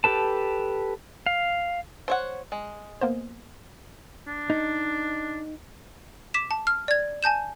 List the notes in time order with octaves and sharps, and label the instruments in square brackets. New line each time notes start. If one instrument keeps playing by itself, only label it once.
[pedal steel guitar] G4 A4 B4 A5
F5
[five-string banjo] C5 C#5 F#5
G#3
[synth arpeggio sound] A#3 B3 C5
[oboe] D4
[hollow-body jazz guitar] D#4
[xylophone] D6 B6 E7
A5
F6
D5 G#6
G#5 A5 G6 E7